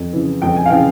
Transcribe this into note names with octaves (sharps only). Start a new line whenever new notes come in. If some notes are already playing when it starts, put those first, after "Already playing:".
Already playing: F2
C#3 E3
F2 G5
G#5
F5
C#3 E3 G5